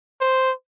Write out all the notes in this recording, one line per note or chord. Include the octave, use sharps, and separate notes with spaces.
C5